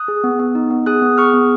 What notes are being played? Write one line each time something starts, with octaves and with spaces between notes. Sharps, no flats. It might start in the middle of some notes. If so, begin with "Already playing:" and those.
Already playing: D#6 F#6
G#4
B3
B3
D#4
B3
G#4 D#6 F#6
B3
G#4 C#6 F6
B3